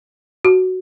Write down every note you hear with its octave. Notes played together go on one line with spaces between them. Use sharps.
F#4